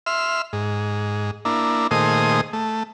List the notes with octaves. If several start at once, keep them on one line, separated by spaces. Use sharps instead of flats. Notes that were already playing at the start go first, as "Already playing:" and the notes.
E5 C6 F6
G#2
A#3 D4 E4
A#2 D#3 A3 G#4 C5 D#6
A3